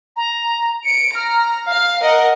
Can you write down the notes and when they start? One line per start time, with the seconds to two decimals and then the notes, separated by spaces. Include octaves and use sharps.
0.17 A#5
0.85 C#7 D7
1.15 A#5 F6
1.67 F5 F6
2.01 A#4 D#5 F#5